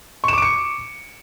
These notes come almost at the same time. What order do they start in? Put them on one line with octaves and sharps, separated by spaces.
C#6 E7 D6 D7 C#7